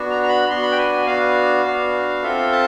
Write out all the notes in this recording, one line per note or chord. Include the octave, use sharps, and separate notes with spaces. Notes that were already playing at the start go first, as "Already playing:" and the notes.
Already playing: B3 D4 F#4
A#5
A#5
B5
B3 D4 F#4 C6
B5
G5
G#5
G#5
B3 D4 F#4 F5
B3 D4 F#4
C4 F4 A4 E5
A5